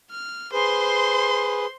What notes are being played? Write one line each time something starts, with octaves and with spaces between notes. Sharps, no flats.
F6
G#4 B4 C5 C6